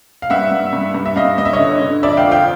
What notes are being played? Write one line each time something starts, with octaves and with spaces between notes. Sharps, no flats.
F5
G2 E5 F#5
G2
G2
G2
E5
G2 D#5 F5
G2 D#5
E5
C#5 D#5
D3
D3
F2 D5 E5
F5 G5
F3
F5 G5